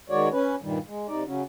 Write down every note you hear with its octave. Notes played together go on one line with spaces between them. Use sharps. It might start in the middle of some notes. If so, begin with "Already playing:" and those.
D#3 G#3 F#4 C#5 D5
C#4 B4
G2 A#2 D#3 G3
G#3
C3 D#4 D5
C#3 F#3 C#4